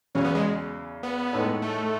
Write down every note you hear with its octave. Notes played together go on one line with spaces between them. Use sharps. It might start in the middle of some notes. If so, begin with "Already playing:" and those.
E2 C#3 F#3 C#4
B3
G#3
B3
A2 G#3 D#4 A4 C#5
A3